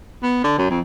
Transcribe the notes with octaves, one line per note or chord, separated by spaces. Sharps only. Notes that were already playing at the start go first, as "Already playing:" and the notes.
B3
D3
F#2
F2